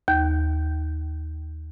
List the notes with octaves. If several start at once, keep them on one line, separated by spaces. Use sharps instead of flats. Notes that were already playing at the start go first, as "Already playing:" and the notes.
D#2 G6